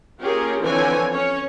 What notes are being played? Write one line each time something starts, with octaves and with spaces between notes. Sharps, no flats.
A#3 C#4 F4 G4 G#4 A#4
D3 E3 F3 C4 C#5 G#5
C#4 C#5